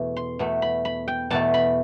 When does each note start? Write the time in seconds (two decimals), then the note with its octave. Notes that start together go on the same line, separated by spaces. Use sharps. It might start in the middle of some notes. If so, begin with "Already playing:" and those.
Already playing: E2 B2 A3
0.17 C6
0.39 E2 B2 A3
0.62 B5
0.85 B5
1.08 G5
1.30 E2 B2 A3 A5
1.54 B5